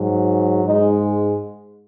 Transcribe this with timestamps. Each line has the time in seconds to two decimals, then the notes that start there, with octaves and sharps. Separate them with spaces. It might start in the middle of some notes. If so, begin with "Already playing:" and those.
Already playing: G#2 F#3
0.65 G#2 G#3 D#4